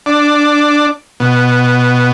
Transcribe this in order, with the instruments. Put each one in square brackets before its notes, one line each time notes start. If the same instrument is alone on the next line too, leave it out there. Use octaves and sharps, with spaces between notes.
[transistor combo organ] D4
B2